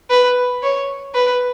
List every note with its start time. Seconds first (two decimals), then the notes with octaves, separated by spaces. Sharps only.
0.10 B4
0.63 C#5
1.15 B4